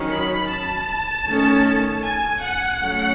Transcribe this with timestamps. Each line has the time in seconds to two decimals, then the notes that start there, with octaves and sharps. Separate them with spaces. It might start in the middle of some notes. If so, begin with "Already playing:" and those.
Already playing: D#3 F#3 C#4
0.10 B5
0.49 A5
1.25 D#3 A3 C#4
2.02 G#5
2.41 F#5
2.80 F#3 A3 C#4